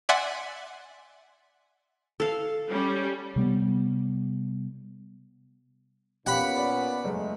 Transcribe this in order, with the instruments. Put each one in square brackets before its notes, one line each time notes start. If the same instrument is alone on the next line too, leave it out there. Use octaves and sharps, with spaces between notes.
[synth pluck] D5 E5 F#5 G#5 C6
[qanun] A4 F5
[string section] G3 C#4
[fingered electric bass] C3 G3 B3
[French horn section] A#2 B3 C#4 [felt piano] G4 F5 [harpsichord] F#5 B5
[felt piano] D5
[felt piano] F#1 [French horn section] G#3 A3